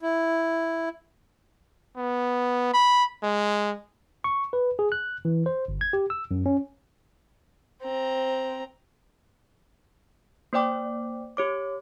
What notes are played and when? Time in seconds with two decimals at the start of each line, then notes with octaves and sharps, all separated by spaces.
0.01 E4
1.97 B3
2.73 B5
3.22 G#3
4.24 C#6
4.53 B4
4.79 G#4
4.92 F#6
5.25 E3
5.46 C5
5.68 G1
5.81 G#6
5.93 G4
6.10 E6
6.31 F#2
6.46 C#4
7.83 C4 A#5
10.53 A#3 C5 D5 G5 D6
11.37 G4 C#5 D6